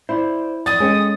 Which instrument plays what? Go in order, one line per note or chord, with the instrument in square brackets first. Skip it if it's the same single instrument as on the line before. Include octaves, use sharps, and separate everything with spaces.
[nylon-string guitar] E4 [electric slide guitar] C5 D5
[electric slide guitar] F2 D5 [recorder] D#6 [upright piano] A6
[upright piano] G#3 [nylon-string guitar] C#4 [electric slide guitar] A4 G5 G#5